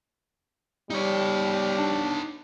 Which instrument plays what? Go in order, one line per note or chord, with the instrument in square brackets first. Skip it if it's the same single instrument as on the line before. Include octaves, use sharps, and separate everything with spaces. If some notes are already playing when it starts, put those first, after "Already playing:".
[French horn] G3 [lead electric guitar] D#4 C#5
[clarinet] D4